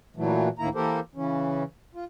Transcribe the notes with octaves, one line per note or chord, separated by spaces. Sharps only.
A#2 E3 F#3 A3
D2 A2 D#3 A#3 E4 A#5
E3 A#3 G4 A4 A#4 C5
C#3 E3 C#4
F4